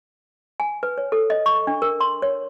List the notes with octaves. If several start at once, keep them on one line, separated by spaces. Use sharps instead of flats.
G#5
B4
C#5
A4
D#5
C#6
D4
A#4
C6
C#5